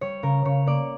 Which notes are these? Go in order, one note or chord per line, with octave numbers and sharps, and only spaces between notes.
G3 C#5
C#3 A#4
C#3 C#5
A#3 D5